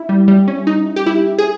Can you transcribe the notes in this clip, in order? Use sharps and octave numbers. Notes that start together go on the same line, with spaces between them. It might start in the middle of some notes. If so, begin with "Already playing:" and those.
Already playing: E4
G3
G3
C#4
D#4
G4
E4
G#4